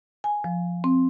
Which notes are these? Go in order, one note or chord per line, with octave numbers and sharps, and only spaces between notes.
G#5
F3
C4